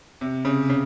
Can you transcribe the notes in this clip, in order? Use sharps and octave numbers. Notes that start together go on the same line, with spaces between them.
C3
C#3
C#3